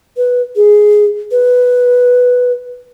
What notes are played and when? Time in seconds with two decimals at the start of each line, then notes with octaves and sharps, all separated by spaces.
0.17 B4
0.56 G#4
1.31 B4